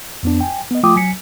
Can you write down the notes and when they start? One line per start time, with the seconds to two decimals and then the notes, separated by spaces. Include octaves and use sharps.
0.23 F2 B3 D4
0.41 G5 G#5
0.71 B3 D#5
0.83 F3 A3 F4 G5 D6 D#6
0.95 F#3 G#5 B6 C#7